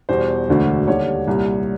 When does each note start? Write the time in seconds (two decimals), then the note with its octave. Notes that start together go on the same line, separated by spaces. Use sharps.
0.09 E2 B2 G3 C5
0.48 E1 D2 D3 F#3
0.87 D#2 D3 G3 C#5
1.28 C2 A#2 G3